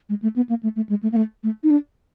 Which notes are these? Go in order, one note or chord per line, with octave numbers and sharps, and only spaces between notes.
G#3
A3
B3
A#3
A3
A3
G#3
A3
A#3
A3
A3
D#4
D4